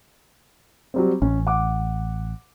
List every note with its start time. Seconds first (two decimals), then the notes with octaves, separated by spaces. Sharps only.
0.94 F#3 G3 C4
1.22 A1 C#4
1.47 F#5 D6